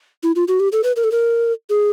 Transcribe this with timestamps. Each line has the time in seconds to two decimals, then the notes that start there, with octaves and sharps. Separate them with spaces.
0.23 E4
0.36 F4
0.48 F#4
0.60 G4
0.72 A4
0.84 B4
0.96 A#4
1.04 A4
1.12 A#4
1.70 G#4